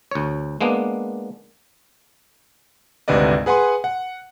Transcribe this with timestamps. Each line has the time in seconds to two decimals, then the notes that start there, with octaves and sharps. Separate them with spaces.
0.11 D2 C#5
0.61 G#3 A#3 B3 D4
3.08 G#1 D2 C3 B4 D5 D#5
3.46 G#4 B4 F#5 G#5 C6
3.84 F#5